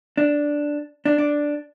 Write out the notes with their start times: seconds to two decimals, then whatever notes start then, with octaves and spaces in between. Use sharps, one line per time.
0.17 D4
1.05 D4
1.18 D4